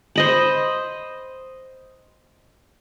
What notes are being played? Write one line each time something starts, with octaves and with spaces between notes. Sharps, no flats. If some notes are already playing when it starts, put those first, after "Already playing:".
C5 D#5 B5